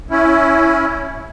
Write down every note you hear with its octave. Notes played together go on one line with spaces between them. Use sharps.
C#4 E4